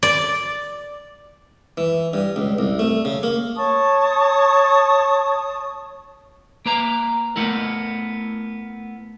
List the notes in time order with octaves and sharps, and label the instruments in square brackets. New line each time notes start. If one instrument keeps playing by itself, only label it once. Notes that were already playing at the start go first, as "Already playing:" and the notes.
[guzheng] D5
[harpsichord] E3
G2
C#2
C2
A3
C#3
A#3
[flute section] C#5 A5 C#6 D#6
[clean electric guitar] A#3 B4 A#5
A3 B3 E4 A#4